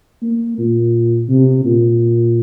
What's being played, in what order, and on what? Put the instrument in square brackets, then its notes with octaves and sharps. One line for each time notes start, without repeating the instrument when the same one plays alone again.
[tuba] A#3
A#2
C3
A#2